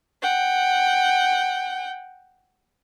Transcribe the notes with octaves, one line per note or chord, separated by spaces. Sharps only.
F#5 G5